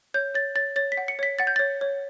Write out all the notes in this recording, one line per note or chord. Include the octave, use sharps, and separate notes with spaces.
C#5 G6
C#5 A6
C#5 A6
C#5 A6
B6
F#5
C#7
C#5 B6
F#5 A6
G6
C#5 A6
C#5